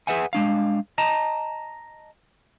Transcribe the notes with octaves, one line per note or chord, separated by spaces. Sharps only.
G#4 B4 E5 F#5 G#5
G#3 D4 F5
D#5 A5 A#5